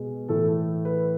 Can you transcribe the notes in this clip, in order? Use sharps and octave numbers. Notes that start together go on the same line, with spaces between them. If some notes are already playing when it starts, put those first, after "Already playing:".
Already playing: B2 G#3
A2 E3 A3 A4
B4